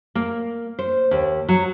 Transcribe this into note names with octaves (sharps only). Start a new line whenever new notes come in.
A#3
C5
D#2
F#3